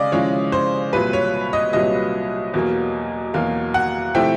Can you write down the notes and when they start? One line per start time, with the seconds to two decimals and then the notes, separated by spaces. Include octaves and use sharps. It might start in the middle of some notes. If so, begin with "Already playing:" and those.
Already playing: C#3 G#3 D5 D#5 F5
0.12 C#3 F3 G#3 C#4 E4 C#5
0.52 C5
0.93 C2 A#2 F#3 B4
1.13 C#5
1.53 D#5
1.73 C2 A#2 F#3 D#5
2.54 E2 B2 F#3 A#3
3.34 E2 B2 F#3 A#3 F5
3.74 F#5
4.15 C3 F3 A3 C4 E4 G5